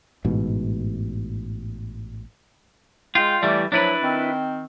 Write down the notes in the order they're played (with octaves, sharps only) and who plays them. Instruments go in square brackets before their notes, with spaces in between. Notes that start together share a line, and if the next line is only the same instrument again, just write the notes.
[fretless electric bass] A1 G#2 B2
[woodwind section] G#3 G5 [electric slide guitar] F4
[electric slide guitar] E3 G3 [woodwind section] A3 D5
[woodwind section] A2 F3 F#3 [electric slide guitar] D4 E4 B4
[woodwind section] D#3 C4